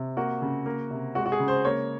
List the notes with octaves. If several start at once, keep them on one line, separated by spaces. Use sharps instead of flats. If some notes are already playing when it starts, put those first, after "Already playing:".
Already playing: C3
A#3 F#4
C#3
A#3
C3
G#3 F#4
F#4
G#4
C#3
C5
A#3 C#5